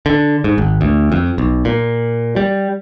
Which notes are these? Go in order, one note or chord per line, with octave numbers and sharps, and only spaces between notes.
D3
G#2
G#1
D2
F2
B1
A#2
G3